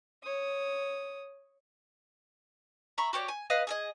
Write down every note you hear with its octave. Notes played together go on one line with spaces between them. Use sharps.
C#5 D#6
E5 A#5 B5 C#6
F#4 G4 C#5 D5
G#5
B4 D#5 F5
G#4 A4 D#5